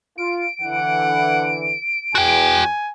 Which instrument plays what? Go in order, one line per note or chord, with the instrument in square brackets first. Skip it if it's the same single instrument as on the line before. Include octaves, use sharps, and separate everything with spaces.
[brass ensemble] F4 [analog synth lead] D7
[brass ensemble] D3 E3 [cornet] F#5
[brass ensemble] E2 [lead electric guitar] F#4 G5 [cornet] G#5